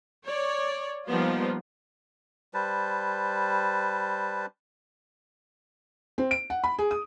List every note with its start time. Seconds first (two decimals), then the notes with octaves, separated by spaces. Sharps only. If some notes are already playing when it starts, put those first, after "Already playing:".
0.25 C#5 D5
1.07 F3 G3 A#3 B3 D#4 F4
2.54 G3 B4 C5 A5
6.18 C4
6.31 D7
6.50 F#5
6.64 B5
6.79 G#4
6.91 D#6